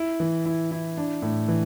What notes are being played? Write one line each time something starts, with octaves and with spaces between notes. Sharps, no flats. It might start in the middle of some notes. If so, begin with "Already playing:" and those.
Already playing: E4
E3
E4
E4
D4
A2
E3